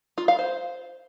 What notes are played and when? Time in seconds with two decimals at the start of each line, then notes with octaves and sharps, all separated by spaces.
0.18 F4
0.28 F5
0.39 C5